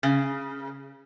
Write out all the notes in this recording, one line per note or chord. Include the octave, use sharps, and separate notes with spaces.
C#3